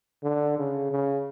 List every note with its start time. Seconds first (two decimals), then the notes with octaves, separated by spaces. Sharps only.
0.23 D3
0.58 C#3
0.91 C#3